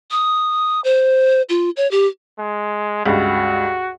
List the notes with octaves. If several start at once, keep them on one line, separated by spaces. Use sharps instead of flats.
D#6
C5
F4
C#5
G4
G#3
C#2 G2 F#4